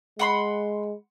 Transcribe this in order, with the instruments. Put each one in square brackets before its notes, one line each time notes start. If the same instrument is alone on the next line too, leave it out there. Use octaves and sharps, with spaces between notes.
[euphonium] G#3 [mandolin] F#5 B5 C6